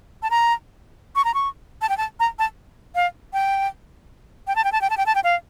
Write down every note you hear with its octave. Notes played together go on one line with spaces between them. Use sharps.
A5
A#5
C#6
A#5
C#6
A5
G5
A5
A#5
A5
F5
G5
G5
A5
G5
A5
G5
A5
G5
A5
G5
F5